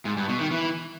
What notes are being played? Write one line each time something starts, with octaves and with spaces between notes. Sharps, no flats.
G#2
G2
B2
D#3
E3